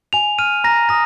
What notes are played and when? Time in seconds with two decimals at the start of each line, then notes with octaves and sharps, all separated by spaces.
0.13 G#5 F7
0.38 F6 D#7
0.64 A#5 A#6
0.89 D#6 A#6